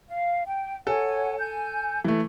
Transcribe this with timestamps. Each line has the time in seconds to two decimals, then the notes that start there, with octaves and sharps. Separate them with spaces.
0.08 F5
0.46 G5
0.87 A4 C#5 F#5 G#5
1.39 G#5 G6
2.04 E3 A3